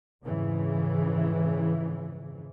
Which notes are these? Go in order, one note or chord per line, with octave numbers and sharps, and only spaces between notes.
F2 G#2 C#3 E3